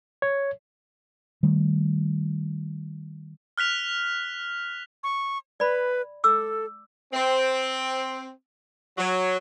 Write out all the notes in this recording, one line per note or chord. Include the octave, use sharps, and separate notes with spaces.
C#5
D#3 G3 A3
F6 F#6 B6 F7
C#6
B4 D5 B5
A4 D6 E6
C4
F#3